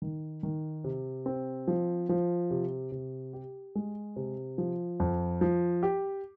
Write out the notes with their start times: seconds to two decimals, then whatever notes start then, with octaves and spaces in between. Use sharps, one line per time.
0.02 D#3
0.43 D#3
0.84 C3
1.26 C4
1.68 F3
2.09 F3
2.51 C3
2.92 C3
3.33 G4
3.75 G#3
4.16 C3
4.58 F3
5.00 F2
5.41 F3
5.83 G4